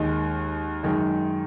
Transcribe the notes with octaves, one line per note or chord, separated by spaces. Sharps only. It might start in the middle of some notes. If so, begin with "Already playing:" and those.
Already playing: D#2 D#3 G#3 D#4
F#2 D#3 G#3 D#4